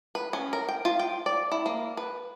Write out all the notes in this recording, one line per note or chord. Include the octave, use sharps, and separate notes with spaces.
B4
C#4
A#4
G5
F4
G5
D5
E4
A#3
B4